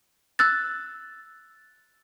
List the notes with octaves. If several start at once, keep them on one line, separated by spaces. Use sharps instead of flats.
E6 F#6 A6